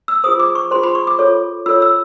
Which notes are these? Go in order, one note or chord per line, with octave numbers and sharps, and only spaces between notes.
E6
F4 G#4 C5 D#6
D6
C#6
F4 G#4 C5 C6
B5
C#6
D6
F4 A4 C#5
F4 A4 C#5 E6
E6